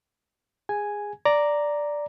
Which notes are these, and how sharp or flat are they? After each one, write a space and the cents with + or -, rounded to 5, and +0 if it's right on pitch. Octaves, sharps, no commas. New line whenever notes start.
G#4 -20 G#5 +0
D5 +0 A#5 +0